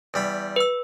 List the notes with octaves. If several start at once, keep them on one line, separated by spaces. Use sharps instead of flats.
E2 G3 B5
B4 E6